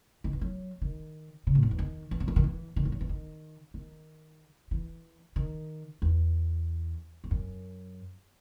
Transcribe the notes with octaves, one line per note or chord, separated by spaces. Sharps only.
D#3
E3
F#3
D#3
C#3
A2
F#2
E2
D#3
E3
F#3
E3
D#3
E3
D#3
E3
F#3
E3
D#3
D#3
E3
D#3
E2
G#2
F#2